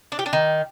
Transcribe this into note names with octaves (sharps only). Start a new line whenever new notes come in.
D4
G4
D4
D#3